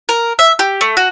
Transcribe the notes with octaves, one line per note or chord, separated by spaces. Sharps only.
A#4
E5
G4
A3
F#4